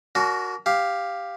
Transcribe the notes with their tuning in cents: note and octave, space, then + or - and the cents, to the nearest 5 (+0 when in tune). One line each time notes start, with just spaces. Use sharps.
D4 -45 F#4 +0 A#4 +0
G4 +5 F5 +0